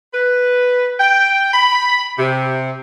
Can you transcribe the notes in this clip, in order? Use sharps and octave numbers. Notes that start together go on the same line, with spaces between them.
B4
G5
B5
C3